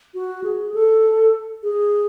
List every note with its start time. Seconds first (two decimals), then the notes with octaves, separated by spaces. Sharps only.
0.14 F#4
0.44 G#4
0.74 A4
1.63 G#4